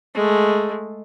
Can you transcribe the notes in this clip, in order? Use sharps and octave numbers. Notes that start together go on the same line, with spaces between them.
G#3 A3